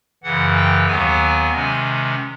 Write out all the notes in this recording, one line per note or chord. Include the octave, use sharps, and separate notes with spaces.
F#2 C#3 E3 F#5
G5
D#2 D#3 F#3 B3 G#5
C3 D#3 G#3 C#4